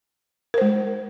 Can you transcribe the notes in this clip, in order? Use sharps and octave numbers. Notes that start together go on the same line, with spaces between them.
G#3 A#4 C5